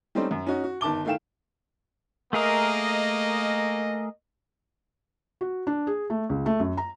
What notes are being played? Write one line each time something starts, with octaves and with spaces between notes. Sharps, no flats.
G3 A3 C4 C#4 D#4 C5
F#2
C#4 D#4 F#4
F#4
G1 D#3 A5 D6 G7
D#3 A3 E4 F5 G5 E7
A3 A#3 G#4 A#4 D#5
F#4
D4
G#4
A3
C#2
A3
F#2
A#5